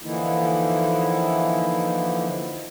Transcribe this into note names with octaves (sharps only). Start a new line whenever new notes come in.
D3 E3 F3 A#3 D#4 E4